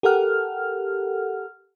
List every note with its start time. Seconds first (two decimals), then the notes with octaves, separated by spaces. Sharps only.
0.03 G4 A4 A#4 F#5 F6